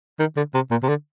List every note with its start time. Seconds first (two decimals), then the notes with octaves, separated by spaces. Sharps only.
0.20 D#3
0.37 D3
0.54 C3
0.71 A#2
0.83 C3
0.89 D3